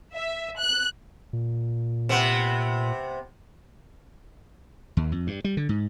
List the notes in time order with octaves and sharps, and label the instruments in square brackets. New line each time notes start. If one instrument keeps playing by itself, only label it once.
[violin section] E5
F#6
[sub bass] A#2
[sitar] C3 B3
[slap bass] D#2
F2
G2
G3
D3
G#2